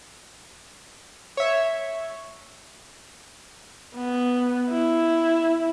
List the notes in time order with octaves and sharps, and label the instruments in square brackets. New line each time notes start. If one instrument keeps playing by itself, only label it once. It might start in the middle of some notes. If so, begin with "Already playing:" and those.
[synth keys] C#5 E5
[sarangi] B3
E4